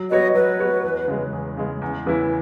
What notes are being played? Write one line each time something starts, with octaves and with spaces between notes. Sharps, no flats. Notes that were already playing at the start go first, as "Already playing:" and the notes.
Already playing: F#3
B3 F#4 C#5 D#5
F#3 B4
B3 F#4 C#5
E2
C#3 G#3
E2
C#3 G#3
E2
C#3 E3 B3 E4